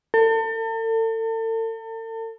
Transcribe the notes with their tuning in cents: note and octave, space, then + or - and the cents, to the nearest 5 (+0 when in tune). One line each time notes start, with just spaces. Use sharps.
A4 +40